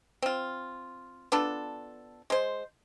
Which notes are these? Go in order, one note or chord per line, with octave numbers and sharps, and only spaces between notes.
C4 F4
B3 D4 F4 A4
G#3 C5